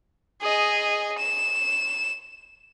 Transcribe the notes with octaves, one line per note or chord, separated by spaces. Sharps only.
G#4 D#5
E7